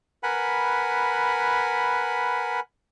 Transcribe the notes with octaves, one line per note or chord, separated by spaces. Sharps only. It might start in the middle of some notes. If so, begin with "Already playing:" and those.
A#4 B4 F#5 G#5 B5